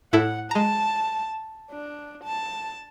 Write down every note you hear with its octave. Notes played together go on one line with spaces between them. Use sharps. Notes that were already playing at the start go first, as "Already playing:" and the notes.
A2 E4 A4 F#5
G#3 A5 A#5
D4
A5